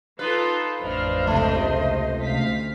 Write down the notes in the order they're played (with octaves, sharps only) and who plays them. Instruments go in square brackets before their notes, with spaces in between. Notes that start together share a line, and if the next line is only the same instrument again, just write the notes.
[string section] D#4 F4 A4 [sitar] B4
[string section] A1 F2 D4 [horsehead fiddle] C5 D#5 [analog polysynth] F5 F6
[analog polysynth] C#2 C3 [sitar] A3
[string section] D2 F5 B6